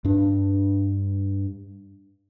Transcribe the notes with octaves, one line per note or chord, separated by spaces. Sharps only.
G2 D4